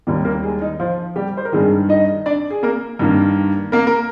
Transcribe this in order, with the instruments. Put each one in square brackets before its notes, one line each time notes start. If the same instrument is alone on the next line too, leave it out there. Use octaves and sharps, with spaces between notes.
[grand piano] D#2 D#3 G3 A#3
A#3 A#4
G#3 G#4
D#4
F3 F4
G3 G4
C5
A#4
G2 D#3 G3 G#3 G#4
D#4 D#5
D4 D5
G#4
A#3 A#4
G2 D#3 A#3
A#3 A#4
A#4